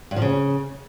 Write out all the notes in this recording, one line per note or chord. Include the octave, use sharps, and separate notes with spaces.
G2
F3
C#3